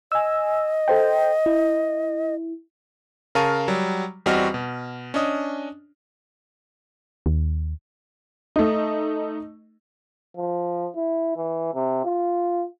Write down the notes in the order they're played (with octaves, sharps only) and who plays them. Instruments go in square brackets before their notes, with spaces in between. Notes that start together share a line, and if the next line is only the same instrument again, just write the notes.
[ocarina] D#5 [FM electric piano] G#5 E6
[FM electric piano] A4 C5 G5
E4
[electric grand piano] C#3 A#4 F5 A5 C#6 D#7
F#3 G3
E2 G3 C4 F#4 D#5 F6
B2
C#4 D4 D#5 D#6
[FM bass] D#2
[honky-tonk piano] A3 D#4
[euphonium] F3
E4
E3
C3
F4